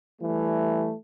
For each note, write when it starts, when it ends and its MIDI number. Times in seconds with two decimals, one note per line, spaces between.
0.21 0.92 52
0.21 0.92 55
0.21 0.92 57